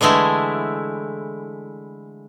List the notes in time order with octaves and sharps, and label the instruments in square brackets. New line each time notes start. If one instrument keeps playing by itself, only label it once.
[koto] D3 E3 G#3 A3 E4